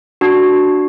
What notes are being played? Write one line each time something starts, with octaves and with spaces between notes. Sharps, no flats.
D4 F#4